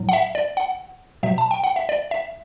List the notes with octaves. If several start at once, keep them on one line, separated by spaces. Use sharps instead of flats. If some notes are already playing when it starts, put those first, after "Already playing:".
Already playing: A2 F#3
F#5
E5
D5
F#5
B2 F#3 E5
A5
G5
F#5
E5
D5
E5